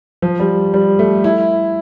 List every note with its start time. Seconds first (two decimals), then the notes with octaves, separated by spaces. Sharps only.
0.22 F3
0.40 G3
0.74 G3
0.99 A3
1.24 E4